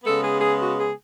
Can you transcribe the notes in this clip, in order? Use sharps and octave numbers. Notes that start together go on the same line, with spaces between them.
C#3 G#3 B3 A4
G#4
G#4
F#4
G#4